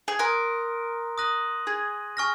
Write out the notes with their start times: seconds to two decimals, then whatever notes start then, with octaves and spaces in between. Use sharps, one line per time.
0.08 G#4
0.19 A#4 C6 D#6 F#6 A#6
1.18 D#6 F#6 A#6 D#7 F#7
1.67 G#4
2.17 G#5 C#6 F6 A#6